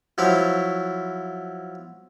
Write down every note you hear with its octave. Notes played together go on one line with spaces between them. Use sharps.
F3 F#3 E4 C#5